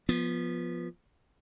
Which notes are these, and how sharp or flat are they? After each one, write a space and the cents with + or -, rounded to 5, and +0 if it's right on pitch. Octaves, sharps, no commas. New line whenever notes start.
F3 +0 B3 -15